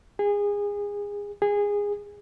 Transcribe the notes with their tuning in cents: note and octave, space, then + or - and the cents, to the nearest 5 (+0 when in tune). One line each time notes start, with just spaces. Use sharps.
G#4 -25
G#4 -20